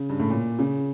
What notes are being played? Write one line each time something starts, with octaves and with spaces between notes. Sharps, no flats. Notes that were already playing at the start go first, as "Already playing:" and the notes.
Already playing: C#3
G2
A2
A#2
C#3